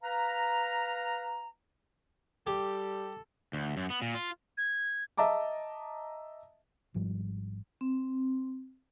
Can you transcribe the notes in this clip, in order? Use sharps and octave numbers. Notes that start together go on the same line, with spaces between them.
B4 F5 A#5
G3 G4 A4
D2
F#2
B3
A#2
F4
G#6
D#5 E5 A5 A#5 D6
G#1 G#2 F3 G3
C4